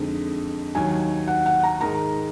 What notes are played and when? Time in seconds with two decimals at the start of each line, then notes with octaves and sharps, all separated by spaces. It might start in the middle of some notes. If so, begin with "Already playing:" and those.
Already playing: F2 D3 G#3 D#4
0.75 D#2 D#3 F#3 G#5
1.28 F#5
1.46 F#5
1.63 A#5
1.81 G#2 D#3 G#3 D#4 A#4 A#5